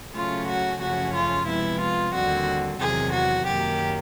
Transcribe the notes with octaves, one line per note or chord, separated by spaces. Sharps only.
C#3 F#3 A3 C#4 F4
F#4
F#2 C#3 F3 A3 C#4 F#4
F4
C3 F3 G#3 B3 E4
F4
D#2 D3 G3 C4 F#4
E2 C3 D#3 F#3 G#4
F#4
F#2 D#3 F#3 A#3 G4